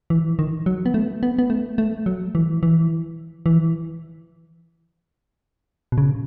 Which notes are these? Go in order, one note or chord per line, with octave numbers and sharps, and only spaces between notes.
E3
D#3
F#3
B3
A3
B3
B3
A3
A3
F#3
E3
E3
E3
B2
C#3